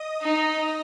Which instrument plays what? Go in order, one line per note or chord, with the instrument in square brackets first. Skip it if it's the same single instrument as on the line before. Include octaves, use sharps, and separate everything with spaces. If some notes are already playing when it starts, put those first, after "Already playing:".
Already playing: [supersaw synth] D#5 D#6
[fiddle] D#4